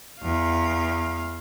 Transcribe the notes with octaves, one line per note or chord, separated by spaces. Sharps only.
E2 F5